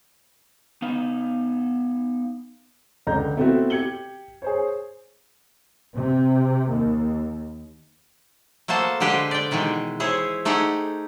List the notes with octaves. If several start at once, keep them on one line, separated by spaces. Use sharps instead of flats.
B3 D#4 F5
C#2 D3 A#5 G6
A3 B3 C4 E4 F#4 E5
G4 G#6 C#7 F#7 G7
G#4 C5 C#5
C3
D#2
A3 A#3 F#4 C5 A5
D3 G#3 G4 B4 C5
D5 G5
B2 D#3 E3 G#3
E4 G#4 C5 C#5
A3 D#4 G4 G#4 F#5